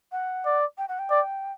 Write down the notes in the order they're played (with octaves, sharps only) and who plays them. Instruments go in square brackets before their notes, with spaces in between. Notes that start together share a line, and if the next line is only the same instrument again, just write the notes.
[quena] F#5
[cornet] D5
[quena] G5
F#5
G5
[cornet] D5